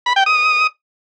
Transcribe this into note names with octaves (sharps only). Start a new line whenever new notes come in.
B5
G5
D#6